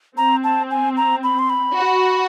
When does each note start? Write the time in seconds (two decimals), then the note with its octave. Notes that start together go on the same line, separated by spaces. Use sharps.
0.17 C4 A#5
0.44 A5
0.71 G#5
0.97 A#5
1.23 B5
1.39 C6
1.50 B5
1.76 F#4